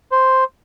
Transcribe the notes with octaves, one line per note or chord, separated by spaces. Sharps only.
C5